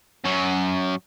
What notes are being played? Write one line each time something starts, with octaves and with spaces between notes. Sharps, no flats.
F#2 F#3